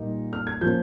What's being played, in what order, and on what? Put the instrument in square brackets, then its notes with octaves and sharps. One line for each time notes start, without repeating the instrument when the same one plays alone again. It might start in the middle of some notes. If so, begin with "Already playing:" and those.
Already playing: [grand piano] A#2 G3 A#3 D#4
F6
G#6
F3 A#3 C#4 G6